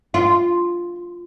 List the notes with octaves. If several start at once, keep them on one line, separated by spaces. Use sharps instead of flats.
F4